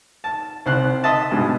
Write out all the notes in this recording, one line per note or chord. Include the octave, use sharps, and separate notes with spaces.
A5
C2 C5 F#6
D#5 E5 A5 C6
G2 B2 G#3